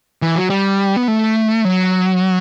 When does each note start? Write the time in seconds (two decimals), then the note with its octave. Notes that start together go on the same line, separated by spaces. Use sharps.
0.22 E3
0.36 F#3
0.50 G3
0.96 B3
1.08 A3
1.65 F#3